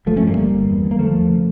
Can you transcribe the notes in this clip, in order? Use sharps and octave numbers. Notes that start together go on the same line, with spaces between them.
G1 F3 A3
A3 C#4
G2 G3 A#3
G1
G1
E2
D3
A#3
D3 F3 A3
E2
C#3